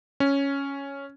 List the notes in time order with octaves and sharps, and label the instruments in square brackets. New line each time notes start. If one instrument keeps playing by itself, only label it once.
[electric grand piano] C#4